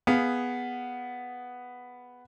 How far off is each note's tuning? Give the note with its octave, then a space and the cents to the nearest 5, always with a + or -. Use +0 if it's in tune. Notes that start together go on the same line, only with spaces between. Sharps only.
B3 +0 G#4 +0 F5 +0